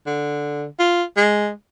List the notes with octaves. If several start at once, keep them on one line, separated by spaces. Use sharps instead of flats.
D3
F4
G#3